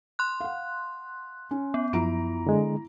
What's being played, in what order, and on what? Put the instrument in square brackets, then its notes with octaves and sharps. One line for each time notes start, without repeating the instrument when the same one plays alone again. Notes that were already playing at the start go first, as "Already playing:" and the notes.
[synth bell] C6 F#6
[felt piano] F5 F#5
C#4
[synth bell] B3
[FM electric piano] F#2 F3 [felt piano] E4 A#5 D7
[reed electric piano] D3 G#3